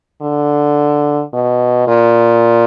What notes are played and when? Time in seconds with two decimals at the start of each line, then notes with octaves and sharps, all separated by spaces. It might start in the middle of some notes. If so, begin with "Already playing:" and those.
0.22 D3
1.33 B2
1.87 A#2